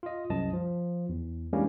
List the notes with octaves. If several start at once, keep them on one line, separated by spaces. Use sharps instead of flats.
F4 D#5
C2 F#2 D#5 A5
F3
E2
E3 G3 G#3 A#3 C#4 D4